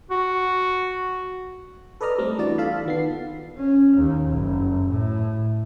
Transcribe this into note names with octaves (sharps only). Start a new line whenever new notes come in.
F#4
A4 B4 D5 D#5 A#5 F6
G3 A3 C4
E3 D4 F#4 D5 A5
F4 A4 F5 A5 B5 C6
D#3 B3 C7
C#4
D#2
F#1
A2